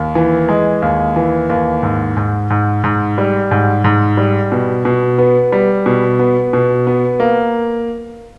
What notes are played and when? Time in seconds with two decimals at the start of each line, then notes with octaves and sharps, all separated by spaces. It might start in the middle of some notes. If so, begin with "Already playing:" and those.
Already playing: D#2
0.15 E3
0.49 G#3
0.82 D#2
1.16 E3
1.50 D#2
1.83 G#2
2.17 G#2
2.50 G#2
2.84 G#2
3.18 G3
3.51 G#2
3.84 G#2
4.17 G3
4.52 B2
4.85 B2
5.18 B3
5.52 G3
5.86 B2
6.19 B3
6.53 B2
6.87 B3
7.20 A#3